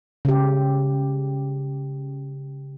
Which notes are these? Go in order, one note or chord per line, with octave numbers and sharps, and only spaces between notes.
C#3 G4